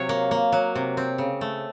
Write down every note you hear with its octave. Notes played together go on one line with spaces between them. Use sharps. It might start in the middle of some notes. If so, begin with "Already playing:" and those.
Already playing: C3 F#3 C#5 F5
A#3
A#3
F#3
C3
C4
C#3
A3